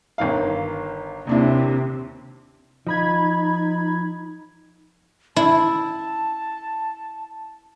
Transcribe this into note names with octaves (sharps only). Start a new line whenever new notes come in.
G1 D#3 F5
D#2 C3 D4 E4
F3 D#4 D#5 B5 G#6
E4 A5